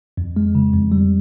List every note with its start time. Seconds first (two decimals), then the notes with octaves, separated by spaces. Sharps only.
0.17 F2
0.36 G#3
0.55 C#3
0.74 F2
0.92 G3